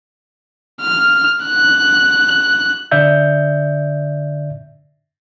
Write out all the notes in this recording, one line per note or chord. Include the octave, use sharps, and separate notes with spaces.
F6
F#6
D3 D5 E5 G6